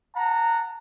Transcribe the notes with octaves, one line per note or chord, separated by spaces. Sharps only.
F#5 A5 A#5